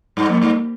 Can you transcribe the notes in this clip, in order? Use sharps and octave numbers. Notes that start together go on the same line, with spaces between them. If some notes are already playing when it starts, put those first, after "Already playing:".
G2
F2 A#3
G2